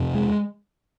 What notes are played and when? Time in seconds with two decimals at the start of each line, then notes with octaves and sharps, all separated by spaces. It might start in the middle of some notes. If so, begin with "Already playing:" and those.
Already playing: F2 C3
0.14 G#3